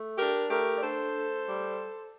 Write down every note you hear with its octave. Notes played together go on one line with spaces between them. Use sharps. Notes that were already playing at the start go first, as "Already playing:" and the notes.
Already playing: A3
D4 G4 A#4
A3 G4 A#4
D5
D4 A4 C5
A3
G3